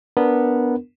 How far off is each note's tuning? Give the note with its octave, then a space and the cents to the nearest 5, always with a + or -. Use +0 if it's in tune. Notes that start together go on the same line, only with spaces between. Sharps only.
B3 -5 D4 -10 A#4 +0